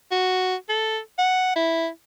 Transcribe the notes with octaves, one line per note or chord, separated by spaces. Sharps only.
F#4
A4
F#5
E4